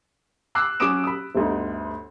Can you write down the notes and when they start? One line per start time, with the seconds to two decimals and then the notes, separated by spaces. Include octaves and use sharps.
0.55 D6 E6 F#6 C7
0.80 F#3 C#4 D6 D#6 D7 E7
1.04 B5 D#6
1.35 G1 D2 D#4